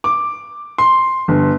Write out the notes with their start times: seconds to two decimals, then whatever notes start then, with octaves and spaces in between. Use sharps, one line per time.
0.04 D6
0.78 C6
1.28 G1